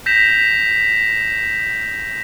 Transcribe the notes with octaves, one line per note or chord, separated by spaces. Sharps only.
G6 A#6 B6 E7 F7